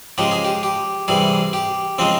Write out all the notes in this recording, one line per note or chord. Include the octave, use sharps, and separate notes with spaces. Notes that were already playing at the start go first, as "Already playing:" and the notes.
C#3 F3 G#3 G4
G#4
G4
G4
C3 E3 G3 G#4
G4
C#3 F3 G#3 C4